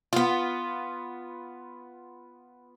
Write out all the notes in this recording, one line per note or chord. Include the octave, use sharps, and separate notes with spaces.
B3 F4